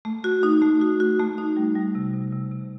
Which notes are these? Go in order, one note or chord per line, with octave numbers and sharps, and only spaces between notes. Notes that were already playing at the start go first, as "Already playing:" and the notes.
A3
F#4
D#4
A3
F#4
F#4
A3
D#4
G3
G3
C3
C3
C3
C3